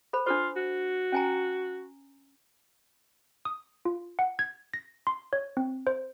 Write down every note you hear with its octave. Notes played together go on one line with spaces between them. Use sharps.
A4 C5 B5
D4 F4 A4 C5
F#4
C#4 G#5 A#5
D#6
F4
F#5
G#6
A#6
C6
C#5
C4
C5